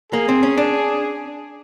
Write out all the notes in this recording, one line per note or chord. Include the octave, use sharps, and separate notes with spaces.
A#3 G#4
C4
C#4
D4